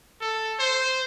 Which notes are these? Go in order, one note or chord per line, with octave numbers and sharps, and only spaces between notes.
A4
C5